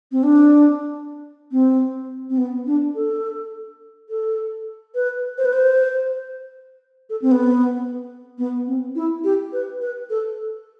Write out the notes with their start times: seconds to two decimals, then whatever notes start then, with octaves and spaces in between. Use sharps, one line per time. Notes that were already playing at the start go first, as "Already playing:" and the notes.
0.12 C4
0.23 D4
1.52 C4
2.30 C4
2.38 B3
2.66 D4
2.95 A4
4.10 A4
4.95 B4
5.38 C5
5.45 B4
5.53 C5
7.10 A4
7.22 C4
7.31 B3
8.38 B3
8.67 C4
8.95 E4
9.24 G4
9.53 B4
9.81 B4
10.10 A4